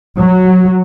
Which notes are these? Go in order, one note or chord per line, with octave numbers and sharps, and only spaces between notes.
F#3